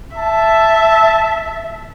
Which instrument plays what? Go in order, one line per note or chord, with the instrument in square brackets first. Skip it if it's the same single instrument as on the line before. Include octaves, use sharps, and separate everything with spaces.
[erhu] E5 [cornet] A5